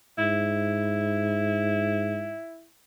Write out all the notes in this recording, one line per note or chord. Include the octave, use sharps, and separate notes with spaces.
G#2 E4